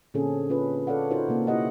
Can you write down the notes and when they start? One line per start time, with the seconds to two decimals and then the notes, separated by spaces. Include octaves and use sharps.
0.14 A#2 D3 C4 C#4 G#4 A4
0.50 C#4 F4 B4
0.87 A4 C#5 D5 F5 F#5
1.10 D#4 F4 F#4 A#4 C5 C#5
1.28 C3 A#3
1.47 E4 G4 D#5 F#5